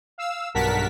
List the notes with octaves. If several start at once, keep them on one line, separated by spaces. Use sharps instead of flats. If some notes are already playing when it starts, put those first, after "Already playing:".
F5 E6
B1 G2 A#4 F#5 A5 B6